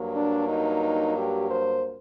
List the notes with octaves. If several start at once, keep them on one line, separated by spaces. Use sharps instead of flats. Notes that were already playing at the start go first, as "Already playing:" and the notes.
Already playing: G2 F#3 A#3
D4
D#4
G4
C5